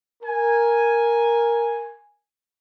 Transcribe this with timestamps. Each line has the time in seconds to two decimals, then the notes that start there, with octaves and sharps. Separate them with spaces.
0.23 A#4 G#5